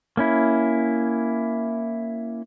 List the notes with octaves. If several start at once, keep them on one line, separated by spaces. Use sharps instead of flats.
A#3 C#4 E4